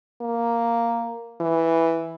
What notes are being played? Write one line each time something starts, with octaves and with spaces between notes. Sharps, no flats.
A#3
E3